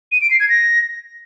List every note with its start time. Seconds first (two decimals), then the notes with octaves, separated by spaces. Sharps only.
0.12 D#7
0.21 D7
0.31 C7
0.40 G#6
0.49 A#6